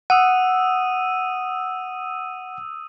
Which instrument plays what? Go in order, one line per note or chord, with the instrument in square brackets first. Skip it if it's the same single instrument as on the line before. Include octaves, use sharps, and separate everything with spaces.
[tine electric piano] F#5 [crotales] D#6 E6 D#7